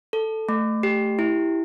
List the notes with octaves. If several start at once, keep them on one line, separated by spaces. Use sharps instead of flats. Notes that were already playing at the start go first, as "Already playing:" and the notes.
A4
A3
G4
E4